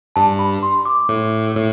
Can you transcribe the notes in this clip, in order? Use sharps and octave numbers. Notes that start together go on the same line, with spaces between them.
G2 A5
B5
C6
D6
A2
A2